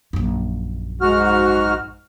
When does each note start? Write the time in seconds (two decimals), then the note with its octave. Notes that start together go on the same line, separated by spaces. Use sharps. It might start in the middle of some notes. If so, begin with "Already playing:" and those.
0.13 A#1 F#2
1.01 G#2 F#4 F6